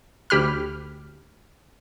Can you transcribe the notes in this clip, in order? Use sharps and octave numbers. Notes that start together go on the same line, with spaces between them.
D2 G4 B5 F6